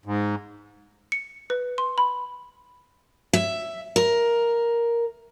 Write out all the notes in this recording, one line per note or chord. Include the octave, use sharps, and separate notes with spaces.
G#2
C#7
B4
C6
B5
E5
A#4